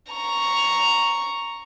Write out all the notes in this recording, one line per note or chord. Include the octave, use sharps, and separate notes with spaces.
A#5 C#6